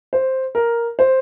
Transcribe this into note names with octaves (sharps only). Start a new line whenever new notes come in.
C5
A#4
C5